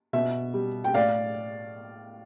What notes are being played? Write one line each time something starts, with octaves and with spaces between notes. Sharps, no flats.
B2 E5
G3
G5
A2 D5 F5